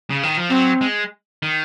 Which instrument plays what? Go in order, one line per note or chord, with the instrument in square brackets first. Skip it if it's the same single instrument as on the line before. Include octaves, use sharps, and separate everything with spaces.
[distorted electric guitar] C#3
D#3
F3
[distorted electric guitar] F#3 [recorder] C4
[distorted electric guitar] G#3
D#3